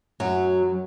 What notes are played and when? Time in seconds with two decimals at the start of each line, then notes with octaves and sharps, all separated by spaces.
0.20 F#2 F#3